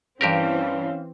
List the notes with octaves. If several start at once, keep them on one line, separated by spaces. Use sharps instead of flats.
G2 E3 C4 C#4 G4 A#4 F5